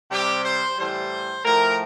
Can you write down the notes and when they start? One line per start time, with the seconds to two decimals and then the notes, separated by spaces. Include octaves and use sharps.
0.10 C3 G3 G4
0.44 C5
0.77 A2 E3 G3 C5
1.44 A2 F3 A3 A#4